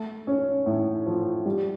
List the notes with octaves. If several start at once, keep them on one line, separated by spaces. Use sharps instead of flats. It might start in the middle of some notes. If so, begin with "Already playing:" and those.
Already playing: A3
C#4
A2
F3
G3